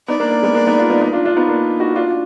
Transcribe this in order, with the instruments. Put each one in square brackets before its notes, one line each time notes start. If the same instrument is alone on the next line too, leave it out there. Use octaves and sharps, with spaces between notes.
[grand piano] B3 D#4 [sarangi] D5
[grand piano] A#3 D4
A#3
G#3 B3
A#3 D4
B3 D#4
D4 F4
B3 D#4
B3 D#4
D4 F4
D4 F4
B3 D#4
A#3 D4
D#4 F#4
D4 F4